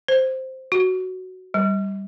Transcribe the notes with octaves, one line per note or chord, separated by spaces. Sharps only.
C5
F#4
G3